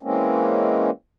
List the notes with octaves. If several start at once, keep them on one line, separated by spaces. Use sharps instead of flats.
E3 G#3 A#3 C4 C#4